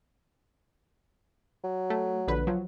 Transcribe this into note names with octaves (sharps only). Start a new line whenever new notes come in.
F#3
A3
A#1 D3 B4
F3 F#3